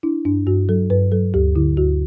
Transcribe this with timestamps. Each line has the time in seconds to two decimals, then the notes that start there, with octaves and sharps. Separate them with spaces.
0.03 D4 E4
0.25 G2 D4
0.47 G2 F#4
0.69 F#3 A4
0.90 G2 B4
1.12 F#3 A4
1.34 D2 G4
1.55 D3 E4
1.77 D2 F#4